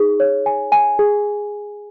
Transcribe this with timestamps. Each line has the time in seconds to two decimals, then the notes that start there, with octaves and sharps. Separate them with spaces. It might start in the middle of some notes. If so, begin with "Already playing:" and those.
Already playing: D#4 G#4
0.20 C#5
0.46 G#5
0.72 G#5
0.99 G#4